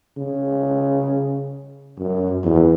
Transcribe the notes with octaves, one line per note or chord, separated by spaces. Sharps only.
C#3
F#2
E2